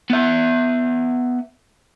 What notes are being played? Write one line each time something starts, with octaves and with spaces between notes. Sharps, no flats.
B3 E5